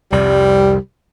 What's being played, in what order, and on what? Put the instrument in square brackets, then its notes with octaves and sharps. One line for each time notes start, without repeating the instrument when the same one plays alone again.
[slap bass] C2 F2 C3 [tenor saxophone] G3 [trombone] G4